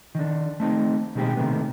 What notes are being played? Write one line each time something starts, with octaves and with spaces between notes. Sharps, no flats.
D#3 D4
A3 C4 D#4
B2 D#3 G#3 C4 G4
C3 D#3 A3 B3